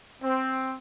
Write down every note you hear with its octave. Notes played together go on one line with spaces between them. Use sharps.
C4